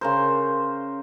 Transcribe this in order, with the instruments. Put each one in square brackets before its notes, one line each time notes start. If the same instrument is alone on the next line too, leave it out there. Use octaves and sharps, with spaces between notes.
[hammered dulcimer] C#3 A#4 C5